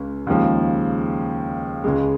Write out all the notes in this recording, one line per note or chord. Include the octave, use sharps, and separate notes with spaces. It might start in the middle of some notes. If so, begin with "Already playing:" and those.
Already playing: C#2 C#3
D#2 C#3 F3 G#3
C#2 C#3 G#3